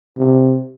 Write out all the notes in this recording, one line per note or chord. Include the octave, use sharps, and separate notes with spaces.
C3